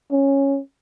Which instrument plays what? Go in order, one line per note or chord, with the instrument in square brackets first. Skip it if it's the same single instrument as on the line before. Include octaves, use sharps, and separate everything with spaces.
[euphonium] C#4